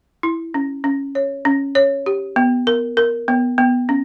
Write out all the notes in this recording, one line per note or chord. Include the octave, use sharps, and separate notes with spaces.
E4
C#4
C#4
C#5
C#4
C#5
G4
B3
A#4
A#4
B3
B3
C#4